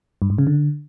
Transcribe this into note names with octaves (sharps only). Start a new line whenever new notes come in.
G2
G#2
C#3
D3